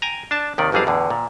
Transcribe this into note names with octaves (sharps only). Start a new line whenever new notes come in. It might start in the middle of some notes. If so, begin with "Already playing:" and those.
G5 G#5 A#5
D4 A5
D#2 C3 D#3 D5
G1 F2 F#3 G3 G#4 F5
E2 A2 D3
A#2